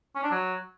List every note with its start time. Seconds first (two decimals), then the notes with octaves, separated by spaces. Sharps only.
0.15 C#4
0.23 D4
0.31 F#3